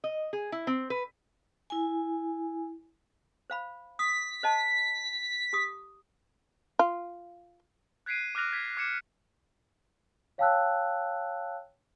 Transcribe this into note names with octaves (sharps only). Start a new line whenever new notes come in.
D#5
G#4
E4
C4
B4
E4 G#5
C5 F5 B5
D#6 B6
C5 D#5 A5
G4 D#6
F4
F#6 G#6 B6 C7 D7 D#7
D6 F6 F#6 A#6 F7
G#6 B6
D6 G#6 C#7 E7
C#5 F5 G5 A5 E6 F#6